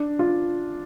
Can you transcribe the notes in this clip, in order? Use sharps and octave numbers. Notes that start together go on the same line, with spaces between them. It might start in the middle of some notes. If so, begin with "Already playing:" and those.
Already playing: D4
F4